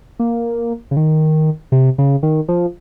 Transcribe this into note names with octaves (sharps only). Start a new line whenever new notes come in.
A#3
C#3
D#3
C3
C#3
D#3
F3